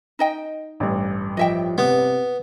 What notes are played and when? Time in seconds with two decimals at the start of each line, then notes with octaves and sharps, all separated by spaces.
0.19 D#4 D#5 G5
0.80 A1 G2
1.37 F3 D#5 E5 G5
1.78 C3 B3